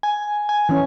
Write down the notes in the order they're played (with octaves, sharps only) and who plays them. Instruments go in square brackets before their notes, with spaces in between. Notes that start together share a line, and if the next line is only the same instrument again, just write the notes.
[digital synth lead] G#5
G#5
[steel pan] E3 C#4